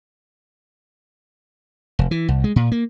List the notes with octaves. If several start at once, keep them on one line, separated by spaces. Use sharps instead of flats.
F1
E3
C2
G#3
A#2
A#3